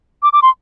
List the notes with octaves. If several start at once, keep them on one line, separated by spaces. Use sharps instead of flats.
D6
D6
C6